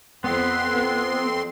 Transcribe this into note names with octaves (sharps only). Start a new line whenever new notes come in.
F2 B3 C4 C6